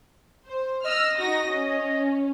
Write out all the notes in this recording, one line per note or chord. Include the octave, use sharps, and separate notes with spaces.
C5
D#5 E6 F6
D#4 F#4 A#6
C#4